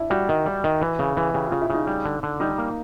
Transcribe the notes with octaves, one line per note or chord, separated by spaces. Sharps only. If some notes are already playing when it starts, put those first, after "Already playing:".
Already playing: D4 E4
G3 F#4
D#3
G3
D#3
E3
C#3
E3
C#3 G4
C#3 F4
E4
C#3 D#4
G3
D3
D3
G3 D#4
A#3